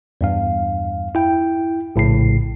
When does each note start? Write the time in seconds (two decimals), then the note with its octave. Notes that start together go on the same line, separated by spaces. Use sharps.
0.21 E2 G2 F5
1.15 E4 G5
1.96 A#1 A2 C#3 C7